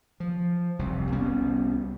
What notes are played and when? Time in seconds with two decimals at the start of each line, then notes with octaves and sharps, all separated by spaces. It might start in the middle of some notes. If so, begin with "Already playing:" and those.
0.20 F3
0.79 F1 C2 C3
1.12 C2 G3 B3 C#4